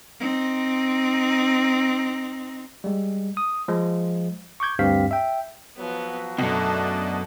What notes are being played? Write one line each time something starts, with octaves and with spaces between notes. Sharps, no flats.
C4 D#4
G3 G#3
D#6
F3 G#3
C#6 D6 G6 G#6
D2 G2 C4 G4 F5 B6
E5 G5
F3 F#3 B3
C#2 F#2 B2 A3 D4 A4